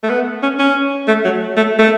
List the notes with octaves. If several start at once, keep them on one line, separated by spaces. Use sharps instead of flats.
A3
B3
C#4
C#4
A3
F#3
A3
A3